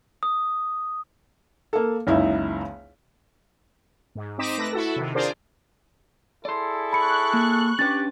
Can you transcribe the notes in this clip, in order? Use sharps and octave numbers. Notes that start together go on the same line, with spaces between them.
D#6
A#3 A4
F#1 C#2 D#4 E4
G#2
C4 D#4 D#5 D6 B6 E7
A3 B4 A#6
E4 F#4 A4
C3 D#3
D4 F4 G#4 A#4 C5 D5
E4 G#4 A4 D5 C6
B5 C#6 F#6 C#7
A#3
C#4 D4 G4 B4 A6